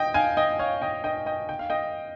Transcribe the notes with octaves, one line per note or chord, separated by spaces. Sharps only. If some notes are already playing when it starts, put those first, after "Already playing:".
Already playing: D#5 G5
F5 G#5
D#5 G5
C#5 F5
D#5 G5
D#5 G5
D#5 G5
G5
F5
D#5 G5